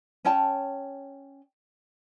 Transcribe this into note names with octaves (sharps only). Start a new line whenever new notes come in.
C#4 C#5 G5 A5